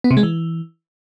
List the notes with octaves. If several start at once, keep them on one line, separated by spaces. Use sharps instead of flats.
B3
C3
G#3
E3